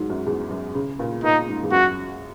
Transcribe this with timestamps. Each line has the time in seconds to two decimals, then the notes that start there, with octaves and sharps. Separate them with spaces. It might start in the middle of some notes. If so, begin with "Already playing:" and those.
Already playing: G#2 F#3
0.10 F#2
0.26 E2
0.51 F#2
0.75 C#3
0.99 A#2
1.24 A#2 D#4
1.48 G#2
1.63 E2
1.72 F#2 F#4